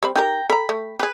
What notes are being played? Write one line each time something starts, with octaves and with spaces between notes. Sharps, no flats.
G3 C4 B5
D#4 G4 A#4 G5 A#5
A4 A#5 B5
A3
G4 G#4 B4